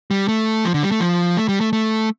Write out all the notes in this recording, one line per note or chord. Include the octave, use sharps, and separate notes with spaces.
G3
A3
F3
D3
G3
A3
F3
A3
G3
A3
A3